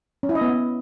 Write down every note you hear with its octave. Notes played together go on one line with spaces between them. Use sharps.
C#4
E4
D#5
B3